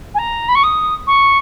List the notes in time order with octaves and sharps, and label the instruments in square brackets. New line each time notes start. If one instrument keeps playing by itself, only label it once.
[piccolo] G#5
A#5
B5
C#6
D#6
C#6